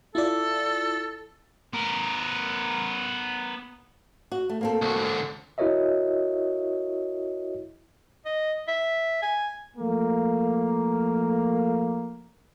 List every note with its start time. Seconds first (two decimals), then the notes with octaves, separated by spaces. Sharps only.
0.15 E4 F4 A4 D5
1.73 B3 A#4
4.32 F#4
4.49 A3
4.61 A#3 C4 A4
4.82 C2 F#4
4.96 G#2 D3
5.58 E4 F#4 A#4 C#5 D#5 E5
8.26 D#5
8.68 E5
9.22 G#5
9.77 F3 A3 A#3